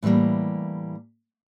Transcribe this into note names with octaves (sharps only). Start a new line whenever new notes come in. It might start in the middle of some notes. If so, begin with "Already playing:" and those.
A2 E3 F3 G3 A#3